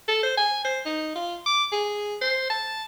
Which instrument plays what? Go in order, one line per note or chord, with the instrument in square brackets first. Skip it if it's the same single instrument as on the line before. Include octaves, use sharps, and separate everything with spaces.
[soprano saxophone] A4
C5
G#5
C5
D#4
F4
D6
G#4
C5
A5